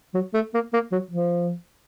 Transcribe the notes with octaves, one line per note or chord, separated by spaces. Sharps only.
F#3
A3
A#3
A#3
F#3
F3